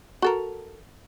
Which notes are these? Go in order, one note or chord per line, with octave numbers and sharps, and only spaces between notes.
F#4 A4 A#4